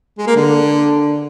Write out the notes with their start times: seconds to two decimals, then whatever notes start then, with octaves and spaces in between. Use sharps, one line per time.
0.18 G#3
0.27 A#3
0.36 D3